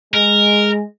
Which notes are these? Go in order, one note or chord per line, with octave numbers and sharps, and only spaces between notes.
G#3 A#4